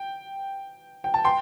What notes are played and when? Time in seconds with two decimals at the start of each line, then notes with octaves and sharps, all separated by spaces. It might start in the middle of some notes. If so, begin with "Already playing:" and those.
Already playing: G5
1.04 G5
1.14 A5
1.24 G5 C6